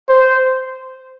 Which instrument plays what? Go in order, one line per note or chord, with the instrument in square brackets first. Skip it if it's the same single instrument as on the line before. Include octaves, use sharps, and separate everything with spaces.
[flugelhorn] C5